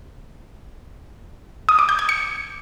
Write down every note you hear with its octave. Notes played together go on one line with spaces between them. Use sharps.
D#6
D6
G6
G#6
C#7